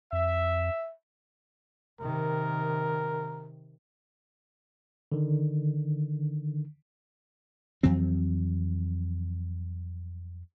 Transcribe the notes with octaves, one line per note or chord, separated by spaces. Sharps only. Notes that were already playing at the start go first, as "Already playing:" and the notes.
F2 E5
C3 D#3 A#4
D3 D#3
F2 E3 F#3 C4